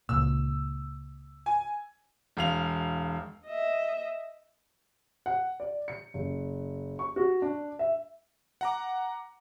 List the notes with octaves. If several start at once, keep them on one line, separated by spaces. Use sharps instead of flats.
C#2 A#2 E6
G#5
E1 F5 F7
D#5 E5
F#5
D5
C#7
F#1
C#6
F#4
D4
E5
F#5 A#5 D6